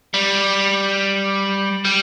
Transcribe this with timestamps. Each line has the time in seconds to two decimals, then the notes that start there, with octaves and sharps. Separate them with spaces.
0.14 G3
1.85 G3